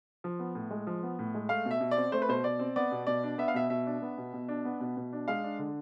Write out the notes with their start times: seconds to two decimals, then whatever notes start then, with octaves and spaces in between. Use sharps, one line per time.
0.24 F3
0.39 B3
0.55 A2
0.71 G#3
0.87 F3
1.03 B3
1.19 A2
1.34 G#3
1.49 A3 F5
1.65 B2
1.71 E5
1.81 B2
1.91 D5
1.96 C4
2.12 A3 C5
2.22 B4
2.29 B2 C5
2.44 B2 D5
2.59 C4
2.76 B3 D5
2.91 B2
3.07 B2 D5
3.23 D4
3.38 B3 E5
3.48 F5
3.54 B2 E5
3.70 B2 E5
3.87 D4
4.02 B3
4.18 B2
4.33 B2
4.48 D4
4.65 B3
4.80 B2
4.97 B2
5.13 D4
5.28 G#3 F5
5.44 D4
5.59 D3